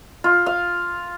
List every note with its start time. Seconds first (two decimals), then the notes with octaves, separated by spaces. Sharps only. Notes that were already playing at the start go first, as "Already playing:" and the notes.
0.24 F4
0.46 F5